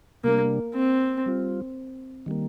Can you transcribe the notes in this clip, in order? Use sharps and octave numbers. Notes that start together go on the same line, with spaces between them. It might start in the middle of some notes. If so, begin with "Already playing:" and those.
C3 G3 A#3 D4
C4
G3 C4 F4
D#3 G3 A#3